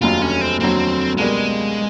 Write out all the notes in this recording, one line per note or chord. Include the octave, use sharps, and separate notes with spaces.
F1 D#2 D3 F#3 F4
C#4
C4
F1 D#2 D3 F#3 C4
C#2 B2 G3 G#3 A#3